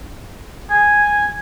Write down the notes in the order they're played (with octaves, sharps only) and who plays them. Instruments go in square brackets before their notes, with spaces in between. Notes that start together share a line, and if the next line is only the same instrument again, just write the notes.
[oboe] G#5